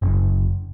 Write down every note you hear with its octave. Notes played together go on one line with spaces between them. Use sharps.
F#1